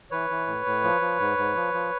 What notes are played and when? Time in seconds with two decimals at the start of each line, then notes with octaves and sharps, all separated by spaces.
0.11 E3 B4 C#5
0.30 E3
0.47 A2
0.66 A2
0.84 F3
1.01 F3
1.20 G#2
1.38 G#2
1.55 F3
1.74 F3